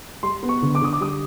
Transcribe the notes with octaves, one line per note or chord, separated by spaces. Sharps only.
G3 C6
B3
C#6
D3
D6
D3 D#6
D6
G3 D#6